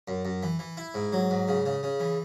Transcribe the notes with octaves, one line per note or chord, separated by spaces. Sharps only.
F#2
F#2
E3
E3
E4
G#2
F#3
G#2
C#3
C#3
C#3
E3